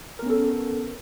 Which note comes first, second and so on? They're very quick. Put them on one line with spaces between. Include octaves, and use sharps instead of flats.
A#4 B3 C#4 A4